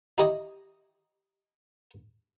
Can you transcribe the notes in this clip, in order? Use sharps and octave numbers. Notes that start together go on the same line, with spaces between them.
D#4 E4 G4 C#5 D#5